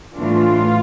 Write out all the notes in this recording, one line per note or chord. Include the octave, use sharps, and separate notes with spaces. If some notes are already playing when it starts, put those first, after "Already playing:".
A2 E3 A3 D4 F4